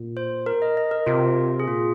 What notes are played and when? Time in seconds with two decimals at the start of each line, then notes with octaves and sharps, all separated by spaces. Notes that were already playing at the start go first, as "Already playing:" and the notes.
Already playing: A#2
0.17 C5
0.46 A#4
0.62 D#5
0.77 D#5
0.91 A#4
1.06 C3 F4
1.60 G#4
1.67 A#2 F4